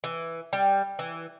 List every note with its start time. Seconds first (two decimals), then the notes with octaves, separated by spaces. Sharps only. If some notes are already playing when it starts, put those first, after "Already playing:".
0.04 E3
0.53 G3
0.99 E3